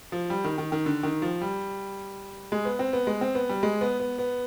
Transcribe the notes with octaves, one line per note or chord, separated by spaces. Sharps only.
F3
G3
D#3
D#3
D#3
D3
D#3
F3
G3
G#3
B3
C4
B3
G#3
C4
B3
G3
G#3
B3
B3
B3